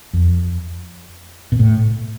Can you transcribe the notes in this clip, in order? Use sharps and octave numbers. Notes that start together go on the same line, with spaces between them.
F2
B2
A2